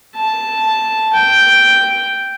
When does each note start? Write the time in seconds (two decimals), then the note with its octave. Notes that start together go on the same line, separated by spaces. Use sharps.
0.15 A5
1.13 G5